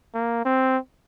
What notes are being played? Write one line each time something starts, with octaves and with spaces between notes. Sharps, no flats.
A#3
C4